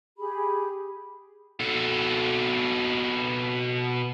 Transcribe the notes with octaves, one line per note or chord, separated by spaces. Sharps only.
G4 G#4 B5
B2 A4